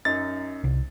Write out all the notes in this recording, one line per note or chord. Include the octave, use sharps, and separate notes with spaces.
F#2 D#4 A6
C2